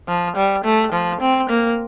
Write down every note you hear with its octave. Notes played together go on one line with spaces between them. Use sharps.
F3
G3
A3
F3
C4
A#3